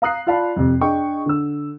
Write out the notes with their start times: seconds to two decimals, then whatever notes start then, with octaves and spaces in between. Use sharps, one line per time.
0.02 F5 A#5 D#6 F#6 C7
0.27 F4 D5 F5 A5 B5
0.56 F2 C3
0.81 D4 G#4 D#5 G5 C#6
1.26 D3 E6